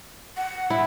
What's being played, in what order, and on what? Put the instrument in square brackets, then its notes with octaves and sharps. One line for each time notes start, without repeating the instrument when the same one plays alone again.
[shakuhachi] F#5
[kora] E4